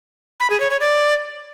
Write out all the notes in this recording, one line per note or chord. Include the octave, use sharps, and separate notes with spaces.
B5
G#4
C#5
C#5
D5